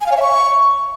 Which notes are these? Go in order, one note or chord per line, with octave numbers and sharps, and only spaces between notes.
G#5
F5
C#5
E5
C#6